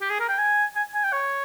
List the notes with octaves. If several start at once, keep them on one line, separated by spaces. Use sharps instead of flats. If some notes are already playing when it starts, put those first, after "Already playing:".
G4
G#4
A#4
G5
G#5
G#5
G#5
G5
C#5